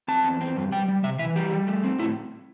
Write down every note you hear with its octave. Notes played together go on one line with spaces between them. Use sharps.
C4 A5
E2
C4
G2
G3 G5
G3
C3 E5
E3 E5
G3 G4
G3
A3
C4
A2 E4